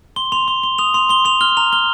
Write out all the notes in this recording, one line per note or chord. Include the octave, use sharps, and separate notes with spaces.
C6 G7
C6 F7
C6 G7
C6 G7
D#6 F7
C6 F7
C6 G7
C6 F7
F6 G7
A#5 F7
F6 G7